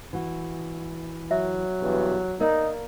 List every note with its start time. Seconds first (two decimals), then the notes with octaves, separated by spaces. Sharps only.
0.13 E3 F#4
1.31 F#3 E5
1.81 E2 G2 B2
2.40 A#3 D#4 A#4 D5